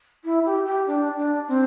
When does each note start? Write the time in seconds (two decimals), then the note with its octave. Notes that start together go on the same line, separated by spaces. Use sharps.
0.25 E4
0.46 G4
0.65 G4
0.87 D4
1.17 D4
1.48 C4